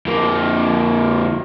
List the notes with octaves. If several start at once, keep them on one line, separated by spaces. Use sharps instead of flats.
F2 A#3